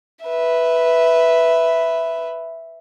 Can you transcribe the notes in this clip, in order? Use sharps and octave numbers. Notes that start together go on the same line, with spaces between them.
B4 E5